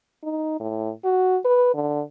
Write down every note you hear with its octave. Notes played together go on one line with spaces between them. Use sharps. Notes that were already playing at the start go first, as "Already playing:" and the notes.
D#4
A2
F#4
B4
D3